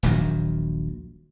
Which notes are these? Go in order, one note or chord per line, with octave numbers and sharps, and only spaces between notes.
D#1 A#1 D#3 F#3